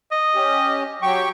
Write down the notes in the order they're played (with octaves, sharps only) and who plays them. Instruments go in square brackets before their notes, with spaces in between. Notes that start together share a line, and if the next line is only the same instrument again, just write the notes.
[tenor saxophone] D#5
[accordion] C#4 G4
[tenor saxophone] F#3 [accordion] G4 G5 C#6